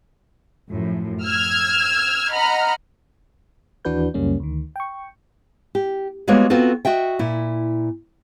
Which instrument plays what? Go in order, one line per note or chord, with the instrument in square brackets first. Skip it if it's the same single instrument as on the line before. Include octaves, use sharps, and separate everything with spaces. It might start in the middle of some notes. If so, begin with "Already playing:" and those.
[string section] F#2 A2 F3
E6 F6 G#6
D#5 F#5 A#5 B5 F6
[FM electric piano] D#2 E3 D4 F#4 B4 G6
C#2 F#2 C#3 G3 A#3 C#4
D2 D#3
G5 C#6
[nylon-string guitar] G4
G3 G#3 A#3 B3 F#4 C#5
B3 C4 F4 F#4 A4
F#4 D#5 E5 G5
A#2 E4